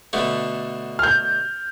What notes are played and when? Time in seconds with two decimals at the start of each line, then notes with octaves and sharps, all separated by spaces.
0.13 B2 D3 A3
0.99 F6 G6